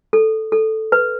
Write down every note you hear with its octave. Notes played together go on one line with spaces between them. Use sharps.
A4
A4
B4